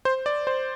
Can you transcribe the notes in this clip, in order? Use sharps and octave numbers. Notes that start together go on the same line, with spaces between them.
C5
D5
C5